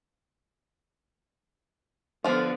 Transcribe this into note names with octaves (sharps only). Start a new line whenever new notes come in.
D3 F3 B3 F4